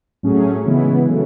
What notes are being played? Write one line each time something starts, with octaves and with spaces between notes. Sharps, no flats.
A2 F#3 A3 C#4 G#4
C#3 E3 G#3 B3 E4
C#3 F#3 A3